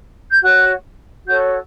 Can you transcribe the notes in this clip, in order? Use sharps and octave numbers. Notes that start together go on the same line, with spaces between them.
G6
F#4 C#5 F#6
F#4 A4 C#5 G6